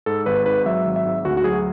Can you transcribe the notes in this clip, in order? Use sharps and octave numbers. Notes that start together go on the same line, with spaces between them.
G#2 A4
G#1 B4
G#2 B4
F#3 E5
G#1
E5
G#2
D2 F#4
F#4
F#3 G#4